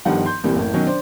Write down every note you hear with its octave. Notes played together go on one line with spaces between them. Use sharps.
G1 G2 D#3 F3 D#4 F#5
C6 G6
C2 A#2 E3 G3
F#1 A2
B2 D#3 F#3 C#4
D4 C5